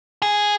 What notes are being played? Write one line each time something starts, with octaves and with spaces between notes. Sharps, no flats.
G#4